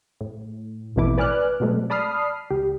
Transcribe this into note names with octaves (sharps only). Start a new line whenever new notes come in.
A2
A1 F2 B2 A3 E4 D6
B4 D5 G#5 D6 F6 F#6
B2 F#3 G#3 A3 C4
D5 A5 B5 D#6 F6 C7
C#2 G4